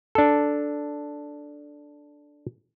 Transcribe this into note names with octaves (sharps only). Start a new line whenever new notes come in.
D4 A4